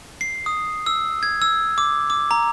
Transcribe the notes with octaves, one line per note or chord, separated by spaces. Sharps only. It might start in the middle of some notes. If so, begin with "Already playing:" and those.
C7
D#6
E6
G#6
E6
D6
D6
A#5